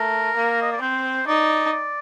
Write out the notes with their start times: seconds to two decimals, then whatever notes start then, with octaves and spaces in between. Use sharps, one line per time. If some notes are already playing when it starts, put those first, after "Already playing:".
Already playing: A3 A#4
0.36 A#3
0.62 D#5
0.72 D5
0.81 C4 C5
1.27 D#4 D5
1.72 D5